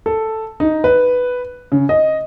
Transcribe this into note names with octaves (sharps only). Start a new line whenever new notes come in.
A4
D#4
B4
C#3
D#5